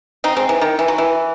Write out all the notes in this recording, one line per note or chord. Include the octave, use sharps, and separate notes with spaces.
C4 D#4
G#3 C4
E3
D#3
E3
F#3
E3